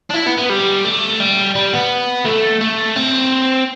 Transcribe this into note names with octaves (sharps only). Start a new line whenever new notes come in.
D4
E4
B3
B3
G3
A3
G3
G3
B3
A3
A3
C4